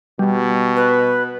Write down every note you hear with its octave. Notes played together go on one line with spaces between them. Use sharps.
B2 G3
B4